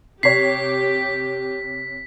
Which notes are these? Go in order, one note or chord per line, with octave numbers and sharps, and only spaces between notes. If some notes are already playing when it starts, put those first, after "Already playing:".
C3 G4 C#5 B6 C7